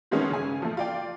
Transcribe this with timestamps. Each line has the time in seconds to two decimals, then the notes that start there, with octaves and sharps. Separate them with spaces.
0.11 D#3 G#3 A3 B3 C#4
0.29 G1 C#3 G#5
0.62 F3 A3
0.77 F4 D5 G5